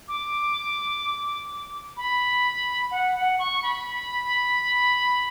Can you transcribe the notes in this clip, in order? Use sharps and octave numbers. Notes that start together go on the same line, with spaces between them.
D6
B5
F#5
F#5
C#6
B5